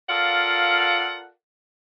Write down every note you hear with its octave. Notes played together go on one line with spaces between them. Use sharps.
F4 A4 A#4 D5 F5 F#5